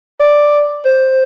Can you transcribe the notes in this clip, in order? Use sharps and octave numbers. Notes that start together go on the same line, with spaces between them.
D5
C5